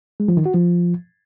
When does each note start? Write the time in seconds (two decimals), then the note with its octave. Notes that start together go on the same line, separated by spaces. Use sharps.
0.20 G#3
0.28 F3
0.37 D#3
0.46 F#4
0.54 F3